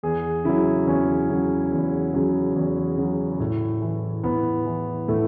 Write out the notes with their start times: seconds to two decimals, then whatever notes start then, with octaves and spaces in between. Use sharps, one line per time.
0.03 E2 G#4
0.44 C#3 F#3 E4
0.87 E2 C#4
1.29 C#3 F#3
1.71 E2
2.14 C#3 F#3
2.56 E2
2.97 C#3 F#3
3.40 A2
3.82 E3
4.24 A2 B3
4.66 E3
5.08 A2 A3